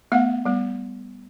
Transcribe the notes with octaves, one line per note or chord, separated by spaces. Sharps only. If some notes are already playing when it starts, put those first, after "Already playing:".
A3 B3 F5 F#5
G3 B3